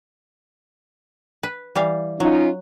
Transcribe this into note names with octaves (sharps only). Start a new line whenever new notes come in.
B4
E3 G3 F5
F#3 C#4 D#4 F4